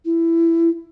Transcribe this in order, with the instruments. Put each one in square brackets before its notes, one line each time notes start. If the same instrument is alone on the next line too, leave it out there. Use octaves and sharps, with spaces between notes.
[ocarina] E4